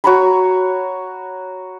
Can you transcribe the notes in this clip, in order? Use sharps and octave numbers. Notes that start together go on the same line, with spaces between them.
F#4 C#5 A#5 B5